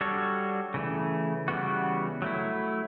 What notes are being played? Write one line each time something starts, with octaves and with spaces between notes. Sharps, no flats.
G3 D4 F#4 A4 C#5
C#3 E3 A3
C#3 E3 G3 B3 F#4
F#3 A3 E4